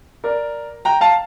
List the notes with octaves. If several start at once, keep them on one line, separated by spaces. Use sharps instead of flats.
A#4 D5
G5 A#5
F5 A5